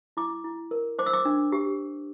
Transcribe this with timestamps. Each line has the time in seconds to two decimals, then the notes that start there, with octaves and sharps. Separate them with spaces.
0.17 E4 D6
0.44 E4
0.71 A#4
0.99 C5 D6
1.06 E6
1.13 D6
1.25 D4
1.52 G4